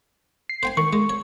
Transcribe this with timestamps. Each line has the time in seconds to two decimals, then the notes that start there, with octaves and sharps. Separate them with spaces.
0.49 C7
0.63 C5 G5 G#5
0.77 D#3 C#6
0.93 G#3
1.09 C#5